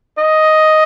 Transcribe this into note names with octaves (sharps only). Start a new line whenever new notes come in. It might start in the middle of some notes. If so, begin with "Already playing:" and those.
D#5